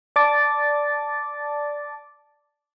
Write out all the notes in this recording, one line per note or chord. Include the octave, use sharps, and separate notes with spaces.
D5 A5 D6 A6